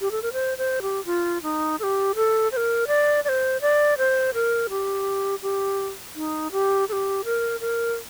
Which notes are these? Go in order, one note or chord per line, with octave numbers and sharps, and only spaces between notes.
G4
A4
A#4
C5
C5
G4
F4
D#4
A4
G4
A4
C5
A#4
D5
D5
C5
D5
C5
A#4
G4
G4
D#4
G4
A4
G4
A#4
A#4